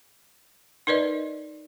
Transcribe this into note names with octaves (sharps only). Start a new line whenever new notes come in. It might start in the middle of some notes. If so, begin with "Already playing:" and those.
D#4 A#4 B4 D5 D#5